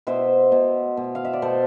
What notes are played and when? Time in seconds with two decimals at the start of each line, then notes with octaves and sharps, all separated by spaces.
0.07 B2 C5 E5
0.52 B2
0.97 B2
1.15 F5
1.25 E5
1.33 D5
1.42 B2 A4 C5